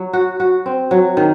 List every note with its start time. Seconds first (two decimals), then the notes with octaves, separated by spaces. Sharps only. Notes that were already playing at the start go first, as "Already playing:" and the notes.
Already playing: F#3
0.13 F#4
0.40 F#4
0.66 C4
0.91 F#3
1.17 D#3